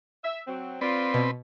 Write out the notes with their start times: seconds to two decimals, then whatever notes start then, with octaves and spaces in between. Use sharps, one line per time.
0.24 E5
0.47 F#3 C4
0.81 C4 F4 B4 D5
1.14 B2